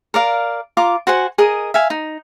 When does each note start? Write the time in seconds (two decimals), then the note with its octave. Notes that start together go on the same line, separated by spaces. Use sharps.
0.14 A#4 D5 F5
0.77 F4 A#5 D6
1.07 F#4 C5 F#5 G#5
1.38 G#4 A#4 D#5
1.74 E5 F5 G#5
1.90 D#4